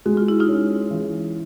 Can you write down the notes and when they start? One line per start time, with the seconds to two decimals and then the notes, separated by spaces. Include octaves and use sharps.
0.06 G#3 F#4
0.17 F4
0.28 E4
0.40 D#4 F4
0.48 C#4
0.91 E3